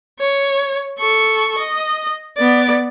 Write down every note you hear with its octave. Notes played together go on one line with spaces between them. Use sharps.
C#5
A4 C#6
D#5
B3 D5